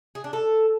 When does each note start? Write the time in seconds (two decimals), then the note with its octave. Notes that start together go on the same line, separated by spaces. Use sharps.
0.15 G#4
0.24 D4
0.33 A4